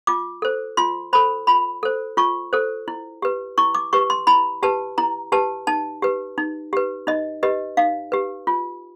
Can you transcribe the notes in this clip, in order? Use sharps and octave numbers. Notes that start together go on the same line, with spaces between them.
F4 D6
A4 C5
F4 C6
A4 C5 B5
F4 B5
A4 C5
F4 C#6
A4 C5
E4
G4 B4
E4 C#6
D6
G4 B4 C#6
C6
E4 B5
G4 B4 A5
E4 A#5
G4 B4 A5
D#4 A5
G4 B4
D#4
G4 B4
D#4 D#5
G4 B4 D#5
D#4 F5
G4 B4
F4